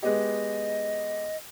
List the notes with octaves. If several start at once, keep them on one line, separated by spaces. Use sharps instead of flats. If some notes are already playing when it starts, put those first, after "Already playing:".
G#3 B3 G4 D#5